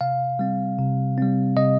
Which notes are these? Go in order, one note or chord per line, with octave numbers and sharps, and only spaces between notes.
C3 F5
G3 C4
C3
G3 C4
C3 D#5